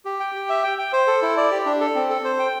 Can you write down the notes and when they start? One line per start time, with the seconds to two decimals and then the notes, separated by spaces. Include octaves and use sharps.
0.05 G4
0.20 G5
0.35 G4
0.49 E5
0.64 G5
0.78 G5
0.93 C5
1.07 A4
1.22 E4
1.37 D5
1.51 G4
1.66 D4
1.80 A4
1.95 C4
2.09 A4
2.24 C5
2.39 G5